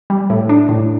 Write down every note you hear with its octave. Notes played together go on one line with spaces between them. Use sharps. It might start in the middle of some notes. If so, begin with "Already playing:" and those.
G3
A2
D4
A2